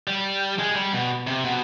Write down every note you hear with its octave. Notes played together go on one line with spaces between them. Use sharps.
G3
G#3
G3
B2
C3
B2